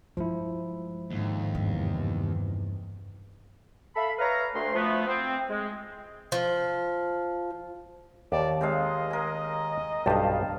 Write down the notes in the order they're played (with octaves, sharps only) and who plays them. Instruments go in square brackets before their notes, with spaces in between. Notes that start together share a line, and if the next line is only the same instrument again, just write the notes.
[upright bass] G2 G#3 [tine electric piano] F3 E4
[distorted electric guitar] D#2 [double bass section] G#2 D3
[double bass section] E2 C3 [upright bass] G2
[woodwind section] A4 E5 F5 B5
B4 C#5 E5 F5 A#5
D2 A3 C6
F3 A3 B3
C4
G#3
[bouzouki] F3
[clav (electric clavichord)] D#2 G4 [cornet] D5 [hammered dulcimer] A5
[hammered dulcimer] C3 G#3 F5 [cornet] D#5
[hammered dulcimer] G#4 A#4
[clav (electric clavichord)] B1 G2 G4 [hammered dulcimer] F5 A5